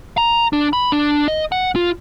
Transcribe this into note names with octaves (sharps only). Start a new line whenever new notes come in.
A#5
D4
B5
D4
D#5
F#5
F4